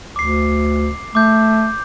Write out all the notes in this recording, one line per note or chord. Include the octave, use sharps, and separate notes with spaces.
D2 D6 C7
A3 D6 G6